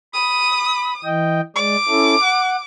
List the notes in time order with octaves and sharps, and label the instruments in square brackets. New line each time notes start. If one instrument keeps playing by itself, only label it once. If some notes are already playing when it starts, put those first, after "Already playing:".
[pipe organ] B5 [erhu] D#6
[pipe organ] E3 D#5 G5
[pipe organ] G#3 D5 [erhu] D6
[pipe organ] C#4 E4 A4
F#5